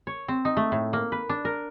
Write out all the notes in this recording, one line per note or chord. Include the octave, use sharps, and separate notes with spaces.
C#5
C4
D#4
A3
A2
A#3
B4
D4
A#4